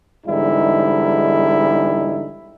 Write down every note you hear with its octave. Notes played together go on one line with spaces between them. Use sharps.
E2 G#2 D3 G3 D#4 E4